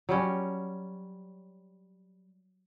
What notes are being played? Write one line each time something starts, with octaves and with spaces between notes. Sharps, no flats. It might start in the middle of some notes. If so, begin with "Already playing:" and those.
F#3 G3 C#4